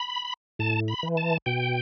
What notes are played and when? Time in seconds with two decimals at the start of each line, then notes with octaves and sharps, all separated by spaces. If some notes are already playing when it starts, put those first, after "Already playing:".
Already playing: B5
0.59 A2 A5
0.88 B5
1.03 E3
1.17 A5
1.46 B2 G5